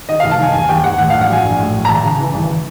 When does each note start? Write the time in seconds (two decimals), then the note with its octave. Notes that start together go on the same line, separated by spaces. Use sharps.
0.09 D#3 D#5
0.20 F1 F5
0.31 A5
0.39 D#3 G#5
0.53 D#2 G#5
0.69 D#2 G5
0.84 D#2 F#5
0.98 A2 F#5
1.10 A#1 F5
1.21 F#5
1.29 F#3 G#5
1.44 A#1
1.58 A2
1.74 A#1
1.85 A#5
1.89 G#1 A5
2.05 C#3
2.20 E3
2.34 G#1